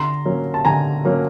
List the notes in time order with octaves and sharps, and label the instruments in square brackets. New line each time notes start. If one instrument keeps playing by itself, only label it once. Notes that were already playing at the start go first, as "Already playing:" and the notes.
Already playing: [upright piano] D3 A#5 C6
F#3 A#3 C#4
A5
D3 G#5 A#5
F#3 A#3 C#4